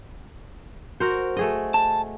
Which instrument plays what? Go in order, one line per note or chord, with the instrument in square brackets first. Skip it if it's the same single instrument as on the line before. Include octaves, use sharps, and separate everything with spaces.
[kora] F#4 A#4 C5
A3 G#4 D#5
[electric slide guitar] A5